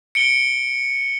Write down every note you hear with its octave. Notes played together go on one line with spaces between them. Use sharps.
C#7 D7 G7